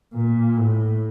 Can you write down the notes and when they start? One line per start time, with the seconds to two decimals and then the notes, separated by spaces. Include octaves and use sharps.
0.14 A#2
0.57 A2